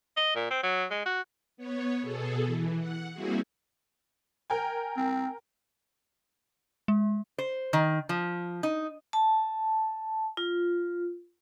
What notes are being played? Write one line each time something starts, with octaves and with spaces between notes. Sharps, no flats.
D#5
A#2
C4
F#3
G#3
F#4
B3 C#5
B2 G#4 A4
E3
F#5
G3 A#3 C4 E4 F#4 G#4
A#4 G5 G#5
C4
G#3
C5
D#3
F3
D#4
A5
F4